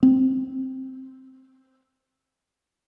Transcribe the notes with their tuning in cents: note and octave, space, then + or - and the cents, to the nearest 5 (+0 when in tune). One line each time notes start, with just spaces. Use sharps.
C4 +5